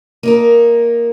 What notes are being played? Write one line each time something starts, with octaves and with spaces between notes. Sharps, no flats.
A#3 D#4 A#4